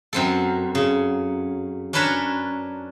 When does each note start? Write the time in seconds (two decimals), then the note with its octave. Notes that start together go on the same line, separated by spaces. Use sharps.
0.13 F#2 C4 A4
0.75 C#3
1.93 C#4 D4 A#4 B4 C#5 A5